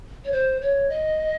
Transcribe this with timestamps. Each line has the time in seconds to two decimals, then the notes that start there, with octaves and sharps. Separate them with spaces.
0.24 C#5
0.32 C5
0.61 C#5
0.89 D#5